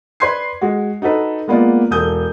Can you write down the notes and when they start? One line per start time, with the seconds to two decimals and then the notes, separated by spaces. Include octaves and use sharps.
0.20 B4 D5 C6 G#6 C7
0.61 G#3 F#4
1.02 D#4 F#4 A4 B4
1.48 G#3 A#3 B3 F4 D5
1.91 E1 A4 D#6 G6